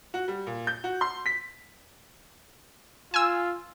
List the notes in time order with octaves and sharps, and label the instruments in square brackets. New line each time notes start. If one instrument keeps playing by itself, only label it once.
[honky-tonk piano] F#4
G3
A#2
G6
F#4
C6
B6
[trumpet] F4 [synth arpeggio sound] G#5 E6